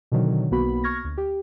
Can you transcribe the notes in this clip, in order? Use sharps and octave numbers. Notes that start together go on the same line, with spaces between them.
B2 D3 D#3 F#3
B1 A#3 B3 F#4 B5
C#6 F6 G#6 A#6
D2
G4